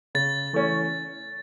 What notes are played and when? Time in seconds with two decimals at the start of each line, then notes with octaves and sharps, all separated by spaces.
0.15 C#3 A6
0.53 E3 A3 C#4